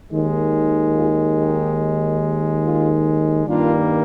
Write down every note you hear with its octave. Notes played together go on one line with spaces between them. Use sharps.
D#2 D#3 G#3
F4 G#4
D#4 G4
F4 G#4
G2 D#3 G3 A#3 D4 F4